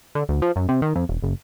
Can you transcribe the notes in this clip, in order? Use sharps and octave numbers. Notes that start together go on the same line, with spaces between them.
D3
D2
F3
F#2
C3
D#3
F2
E1
F#1